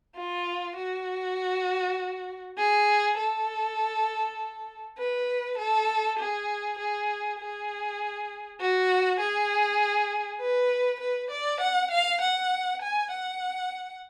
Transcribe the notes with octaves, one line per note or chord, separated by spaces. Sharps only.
F4
F#4
G#4
A4
B4
A4
G#4
G#4
G#4
F#4
G#4
B4
B4
D5
F#5
F5
F#5
G#5
F#5